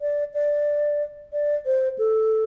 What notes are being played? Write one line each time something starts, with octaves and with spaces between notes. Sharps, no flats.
D5
D5
D5
C5
A4